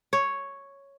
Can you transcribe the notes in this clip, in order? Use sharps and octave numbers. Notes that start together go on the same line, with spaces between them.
C#5